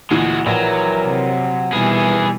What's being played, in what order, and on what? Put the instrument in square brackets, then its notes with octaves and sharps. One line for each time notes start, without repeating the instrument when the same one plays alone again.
[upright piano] D2 A#2 E3 [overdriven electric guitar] G#3 F#4
[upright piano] A#1 [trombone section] E3 A#4 [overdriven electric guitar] F#3
[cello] C3
[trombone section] D#2 E3 [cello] B2 G3 [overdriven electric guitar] G#4 B4